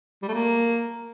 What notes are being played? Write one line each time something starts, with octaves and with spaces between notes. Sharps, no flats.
G3
A3
A#3